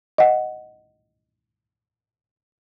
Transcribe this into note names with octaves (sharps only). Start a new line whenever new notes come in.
D#5 F#5